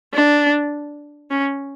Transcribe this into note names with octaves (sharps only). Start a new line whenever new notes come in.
D4
C#4